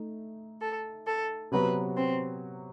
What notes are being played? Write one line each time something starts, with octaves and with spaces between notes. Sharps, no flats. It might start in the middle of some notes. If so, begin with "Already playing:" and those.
Already playing: A3 D#4
A4
A4
C3 F#3 B3 F#4 B4
C4